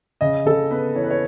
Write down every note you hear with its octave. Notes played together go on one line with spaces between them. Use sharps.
C#3 D#5
C#3 A4
B3 B4
E3 C#5
B4
C#5